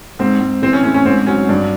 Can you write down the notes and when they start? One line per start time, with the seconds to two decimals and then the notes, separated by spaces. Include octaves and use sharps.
0.19 G#2 C4
0.41 G#2
0.62 E3 C4
0.73 C#4
0.84 A2 C#4
0.94 C#4
1.05 G#2 C4
1.27 F#3 C#4
1.49 G2 D4